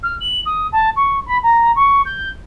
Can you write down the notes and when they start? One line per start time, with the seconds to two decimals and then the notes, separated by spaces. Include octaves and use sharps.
0.03 F6
0.20 F#7
0.45 D#6
0.72 A5
0.96 C#6
1.26 B5
1.43 A#5
1.75 C#6
2.05 G6